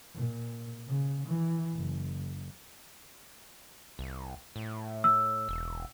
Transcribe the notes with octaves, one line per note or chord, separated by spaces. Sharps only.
A#2
C#3
E3
F#1
C2
A2
E6
E1